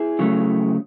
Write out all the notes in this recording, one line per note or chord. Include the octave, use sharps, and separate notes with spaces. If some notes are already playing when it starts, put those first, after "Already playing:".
Already playing: E4 G#4
C#3 F#3 A3